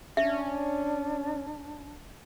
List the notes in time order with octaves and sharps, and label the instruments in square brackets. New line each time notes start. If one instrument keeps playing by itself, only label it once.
[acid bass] C#4 [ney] D4 [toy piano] E5